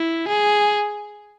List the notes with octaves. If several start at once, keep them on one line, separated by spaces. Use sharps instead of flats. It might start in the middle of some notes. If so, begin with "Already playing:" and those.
Already playing: E4
G#4